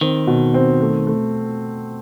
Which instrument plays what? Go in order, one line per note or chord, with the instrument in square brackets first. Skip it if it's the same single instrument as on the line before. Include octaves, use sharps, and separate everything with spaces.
[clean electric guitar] D#3 [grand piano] C4
[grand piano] B2
C4
A3
A3